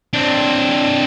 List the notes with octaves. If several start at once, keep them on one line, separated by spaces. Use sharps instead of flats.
C4 D4